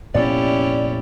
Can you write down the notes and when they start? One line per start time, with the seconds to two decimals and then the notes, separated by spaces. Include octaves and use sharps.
0.14 F1 A#2 B3 C#4 E4 G4 D5